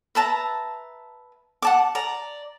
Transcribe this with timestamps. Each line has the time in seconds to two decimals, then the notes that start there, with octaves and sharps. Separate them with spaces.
0.15 B4 E5 A5 A#5
1.62 F#5 A5 D6
1.95 D5 A#5